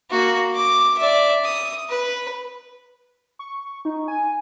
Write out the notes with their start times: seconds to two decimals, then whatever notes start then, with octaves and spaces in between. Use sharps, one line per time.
0.11 A#3 F#4
0.54 D6
0.98 D5 E5
1.44 D#6
1.89 B4
3.39 C#6
3.85 D#4
4.08 G#5